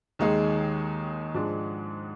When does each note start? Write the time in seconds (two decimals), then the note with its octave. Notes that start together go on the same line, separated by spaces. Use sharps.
0.19 D#2 D#3 G#3 D#4 G#4
1.34 G#2 F3 G#3 D4